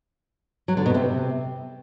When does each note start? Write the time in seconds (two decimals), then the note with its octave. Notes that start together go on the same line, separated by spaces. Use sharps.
0.68 F#3
0.77 D3
0.86 B2
0.94 C3